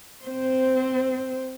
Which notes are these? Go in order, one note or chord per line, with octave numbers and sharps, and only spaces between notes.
C4 C5